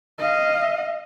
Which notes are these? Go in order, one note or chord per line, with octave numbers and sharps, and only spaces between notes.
D#5 F5